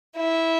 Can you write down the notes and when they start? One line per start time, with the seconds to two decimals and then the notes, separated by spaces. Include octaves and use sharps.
0.18 E4